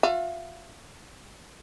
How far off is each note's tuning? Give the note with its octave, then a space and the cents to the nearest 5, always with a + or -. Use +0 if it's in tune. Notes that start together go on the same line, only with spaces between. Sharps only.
F4 +40 E5 +40